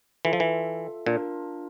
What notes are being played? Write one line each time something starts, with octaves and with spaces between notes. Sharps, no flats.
E3 F4 A4 E5
F3
E3
A#2 D4 F4 A#4